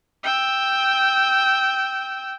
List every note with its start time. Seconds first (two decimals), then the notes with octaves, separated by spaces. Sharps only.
0.23 G5 E6